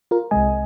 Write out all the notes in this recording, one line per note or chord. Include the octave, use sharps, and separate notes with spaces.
F4 A#4
C2 C3 G#3 D#5 G#5